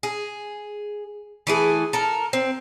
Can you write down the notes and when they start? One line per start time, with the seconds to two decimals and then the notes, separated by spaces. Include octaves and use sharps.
0.03 G#4
1.47 E3 A3 G#4
1.93 A4 A#4
2.33 C4